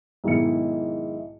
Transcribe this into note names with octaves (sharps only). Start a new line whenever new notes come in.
B1 G#2 D#3 E4 C#7